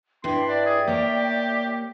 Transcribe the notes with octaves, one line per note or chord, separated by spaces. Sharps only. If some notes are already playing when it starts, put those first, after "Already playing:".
G2 D4 E4 G5 C6
D4 D5 E5 G5
G#4
A#3 G4 C#5